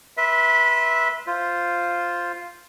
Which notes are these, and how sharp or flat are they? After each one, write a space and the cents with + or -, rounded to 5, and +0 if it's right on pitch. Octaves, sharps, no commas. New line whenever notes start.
B4 -25 E5 -10 C6 -25
F4 +0 C5 +0